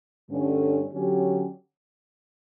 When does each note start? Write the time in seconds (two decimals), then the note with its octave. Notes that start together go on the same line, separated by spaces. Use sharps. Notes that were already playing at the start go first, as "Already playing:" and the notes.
0.28 G2 D3 A3 C#4
0.90 D3 F#3 C#4 G4